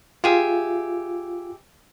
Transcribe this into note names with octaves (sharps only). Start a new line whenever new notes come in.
F4 G4 G#4 E5